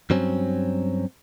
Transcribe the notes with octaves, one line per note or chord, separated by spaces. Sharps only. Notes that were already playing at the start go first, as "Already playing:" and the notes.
G2 F#3 C4 C#4